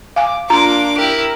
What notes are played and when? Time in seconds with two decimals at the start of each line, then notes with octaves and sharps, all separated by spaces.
0.16 F5 G#5 D6
0.50 A#3 D4 F4 A#5 C6 D6
0.98 E4 G4 A#4